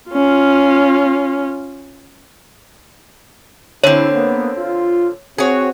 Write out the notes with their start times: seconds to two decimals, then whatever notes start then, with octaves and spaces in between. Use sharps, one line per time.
0.11 C#4 F4
3.84 D3 C4 E4 C#5
4.13 A#3 B3
4.58 F4
5.38 C4 F#4 G#4 C#5